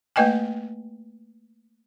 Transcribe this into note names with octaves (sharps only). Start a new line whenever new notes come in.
A3 A#3 B4 D#5 G5 G#5